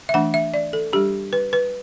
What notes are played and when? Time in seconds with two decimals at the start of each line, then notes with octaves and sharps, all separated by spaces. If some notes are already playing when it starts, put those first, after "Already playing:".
0.09 E5
0.14 E3 A3 D4 F#5
0.34 E5
0.54 D5
0.73 A4
0.93 G3 D4 G4
1.33 B4
1.53 B4